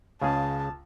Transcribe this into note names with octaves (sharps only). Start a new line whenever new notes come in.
C#2 C#3 G#4 A5